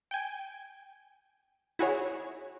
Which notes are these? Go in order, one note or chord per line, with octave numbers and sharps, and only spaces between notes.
G5 G#5
E4 F#4 G#4 C#5